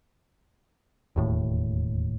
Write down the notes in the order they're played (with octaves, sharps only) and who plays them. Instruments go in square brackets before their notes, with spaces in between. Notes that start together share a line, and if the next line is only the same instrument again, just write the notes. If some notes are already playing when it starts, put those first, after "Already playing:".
[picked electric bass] E1 D#2 A2